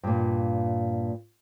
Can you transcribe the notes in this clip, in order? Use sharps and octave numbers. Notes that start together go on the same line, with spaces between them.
G2 A#2